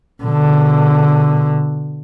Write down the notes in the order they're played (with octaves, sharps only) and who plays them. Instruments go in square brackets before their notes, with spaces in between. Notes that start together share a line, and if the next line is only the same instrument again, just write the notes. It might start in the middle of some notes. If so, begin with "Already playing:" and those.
[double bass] B2 D3